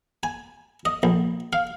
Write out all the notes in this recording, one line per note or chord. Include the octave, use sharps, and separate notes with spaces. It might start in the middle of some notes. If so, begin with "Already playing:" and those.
G#5
D#5
A#1
F5